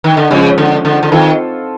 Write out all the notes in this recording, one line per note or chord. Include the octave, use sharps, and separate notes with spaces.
D#3
D3
C#3 F3 G#3 C#4
D3
D3
D3
D#3 C4 F4 A4